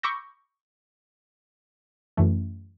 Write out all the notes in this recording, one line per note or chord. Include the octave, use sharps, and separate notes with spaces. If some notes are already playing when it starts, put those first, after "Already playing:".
B5 C#6 D6 E6 G6 A#6
F#2 E3 A3